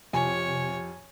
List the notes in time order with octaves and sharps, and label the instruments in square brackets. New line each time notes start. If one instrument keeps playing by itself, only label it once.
[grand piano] F2 F4 G4 [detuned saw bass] C3 [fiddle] C#5 [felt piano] G#5